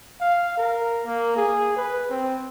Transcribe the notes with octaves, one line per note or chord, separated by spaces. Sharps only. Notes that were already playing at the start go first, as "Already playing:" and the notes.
F5
A#4
A#3
G#4
B4
C4